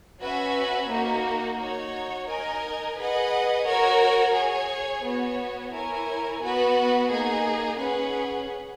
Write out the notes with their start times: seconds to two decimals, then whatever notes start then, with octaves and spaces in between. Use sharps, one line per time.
0.21 C#4 F#4 B4 E5
0.89 A#3 D#4 F#4
1.58 D#4 F#4 C#5
2.28 D#4 A#4 D#5 G#5
2.96 G#4 B4 D#5 F#5
3.65 F#4 A#4 C#5
4.34 G#4 C#5 G#5
5.03 B3 F#4 C#5
5.72 E4 A#4 C#5 G#5
6.40 B3 F#4 B4
7.09 A#3 D#4 G#4
7.78 C#4 G#4 B4 F#5